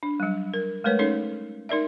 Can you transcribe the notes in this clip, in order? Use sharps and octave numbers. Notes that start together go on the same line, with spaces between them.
D4
F#3 G3
A#4
G#3 A3 A#4 B4 C#5
C#4 D#4 A4 C#5
D#4 A#4 D5 E5